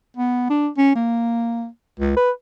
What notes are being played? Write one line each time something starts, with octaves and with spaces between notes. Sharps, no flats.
B3
D4
C#4
A#3
C#2
B4